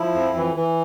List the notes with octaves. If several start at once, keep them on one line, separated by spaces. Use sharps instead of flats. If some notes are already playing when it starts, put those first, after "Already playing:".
Already playing: F3 E4
F2
E3
E3